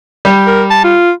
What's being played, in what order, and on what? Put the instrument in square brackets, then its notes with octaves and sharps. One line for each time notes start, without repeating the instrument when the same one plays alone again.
[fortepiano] G3
[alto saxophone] A#4
A5
F4